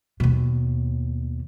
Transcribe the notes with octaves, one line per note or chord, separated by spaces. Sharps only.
D#2 B2